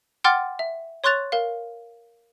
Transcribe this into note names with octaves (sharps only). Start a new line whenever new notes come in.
F#5 G5 C6 D6 F6 A6
E5
C#5 C6 C#6 F#6 A6 F7
A#4 F5